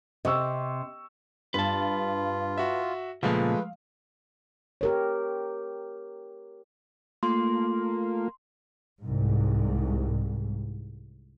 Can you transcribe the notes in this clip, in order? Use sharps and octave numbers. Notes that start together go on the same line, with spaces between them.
C3 D#5 C#6 E6
G2 F4 B4 A5
F#4 E5
C#2 A#2 F3 G#3 A3 B4 F5
G4 A#4 C#5
A3 A#3 F4 C6
C2 G#2